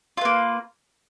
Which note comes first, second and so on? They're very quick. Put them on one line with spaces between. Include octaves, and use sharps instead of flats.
F4 B4 A#3